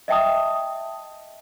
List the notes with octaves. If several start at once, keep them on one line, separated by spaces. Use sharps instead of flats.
D#5 E5 G5 A5 D#6